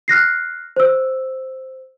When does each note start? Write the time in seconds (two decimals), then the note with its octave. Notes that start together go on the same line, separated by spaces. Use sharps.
0.08 F6 F#6 A#6 C7
0.76 C5 E6